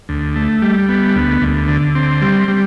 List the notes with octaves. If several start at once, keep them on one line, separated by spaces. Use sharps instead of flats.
D2
A3
G3
B3
D2
D2
D3
C4
G3
G3